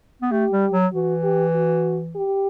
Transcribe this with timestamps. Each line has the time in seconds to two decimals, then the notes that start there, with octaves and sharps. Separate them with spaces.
0.22 B3
0.31 A3 G4
0.52 G3
0.72 F#3
0.93 E3 F#4
1.24 G4
1.55 F#4
2.16 G4